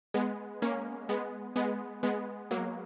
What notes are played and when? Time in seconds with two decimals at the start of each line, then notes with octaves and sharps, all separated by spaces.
0.14 G#3 B3
0.62 A#3 C#4
1.09 G#3 B3
1.56 G#3 B3
2.03 G#3 B3
2.51 F#3 A#3